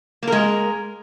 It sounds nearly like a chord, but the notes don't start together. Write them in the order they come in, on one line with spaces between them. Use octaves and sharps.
A#3 A#4 G#3